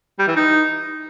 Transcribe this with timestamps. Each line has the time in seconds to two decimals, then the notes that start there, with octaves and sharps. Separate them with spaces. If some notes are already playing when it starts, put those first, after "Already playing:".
0.19 G3
0.28 E3
0.36 D#4